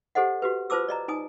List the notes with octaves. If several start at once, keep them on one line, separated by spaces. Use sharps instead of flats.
G4 A4 C5 D#5 F#5
F#4 G4 B4
F4 B4 C5 A5 D6 E6
D5 D#5 A#5
D#4 G#5 D#6